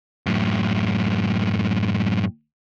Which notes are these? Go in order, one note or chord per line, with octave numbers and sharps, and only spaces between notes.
F#2 A2